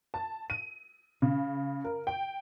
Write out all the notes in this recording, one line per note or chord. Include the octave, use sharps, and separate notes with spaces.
A5
D#7
C#3
A#4
G5